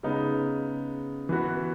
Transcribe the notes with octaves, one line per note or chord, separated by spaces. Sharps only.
C#3 G#3 B3 D#4
E3 B3 F#4 B4